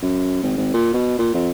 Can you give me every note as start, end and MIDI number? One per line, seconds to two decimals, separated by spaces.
0.02 0.42 42
0.43 0.55 32
0.57 0.72 32
0.74 0.89 46
0.94 1.14 47
1.19 1.31 46
1.34 1.51 41